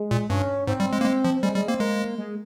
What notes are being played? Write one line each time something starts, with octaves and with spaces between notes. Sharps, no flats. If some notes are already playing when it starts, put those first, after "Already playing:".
Already playing: G#3
A#2
G2 C#4
G#2 C4
G3
G#3
A#3
G#3
F3
G3 G#3
G3 G#3
A#3 C4
G#3 A#3
G#3